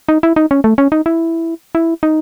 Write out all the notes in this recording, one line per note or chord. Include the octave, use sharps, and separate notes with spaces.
D#4
E4
D#4
C#4
A3
C#4
D#4
E4
E4
D#4